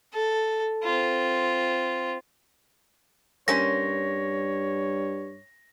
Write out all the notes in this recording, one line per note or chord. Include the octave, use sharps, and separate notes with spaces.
A4
C4 F4
G2 A#3 C#4 C5 C#5 A#6